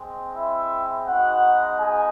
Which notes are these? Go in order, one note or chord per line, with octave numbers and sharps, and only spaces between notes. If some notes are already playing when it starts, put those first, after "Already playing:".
Already playing: G#3 C4
E4 E5
G#3 B3 D#4 F#4 F#5
G#4 G#5